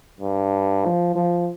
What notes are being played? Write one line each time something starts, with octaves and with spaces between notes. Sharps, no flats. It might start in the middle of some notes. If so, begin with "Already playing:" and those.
G2
F3
F3